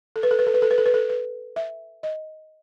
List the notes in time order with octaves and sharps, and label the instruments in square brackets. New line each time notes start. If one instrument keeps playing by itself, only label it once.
[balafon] A4
B4
A4
B4
A4
B4
A4
B4
A4
B4
A4
B4
E5
D#5